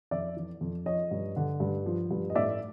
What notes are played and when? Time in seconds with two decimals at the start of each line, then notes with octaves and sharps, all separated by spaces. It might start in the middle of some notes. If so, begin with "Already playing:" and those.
0.11 F2 D5 E5
0.36 E3
0.61 F2
0.86 F3 C#5 D#5
1.11 G2
1.36 D3
1.60 G2
1.86 F3
2.11 G2
2.30 D#5
2.35 A2 D5 E5